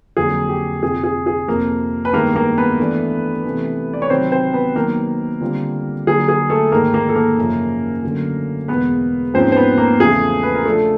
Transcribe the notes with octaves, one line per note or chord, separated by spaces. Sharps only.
F2 D3 F#3 A#3 G#4
G4
F2 C3 F3 G#4
G#4
G#4
F2 C3 F3 A#3 A#4
B4
G2 D#3 G#3 A#3 B3 A#4
A#3 A#4
B3 B4
E3 A3 D4
C3 E3 A3
D5
C#5
C3 D#3 F#3 C4 C5
C4 C5
B3 B4
D#3 F#3 A#3 B3 A#4
D3 G3 C4 F4
D3 F#3 A#3 G#4
G#4
A3 A4
G#2 D#3 G#3 A#3 A#4
A#3 A#4
A4
A#3 A#4
F#2 C#3 F3
D3 F#3 A3 C#4
E2 B2 G#3 B3 B4
G#2 F3 A#3 C4 C#4 F4 C5
C5
B3 B4
A#3 A#4
E2 C#3 F3 A3 G#4
B4
A#4
C#3 F3 A3 D4 F4 A4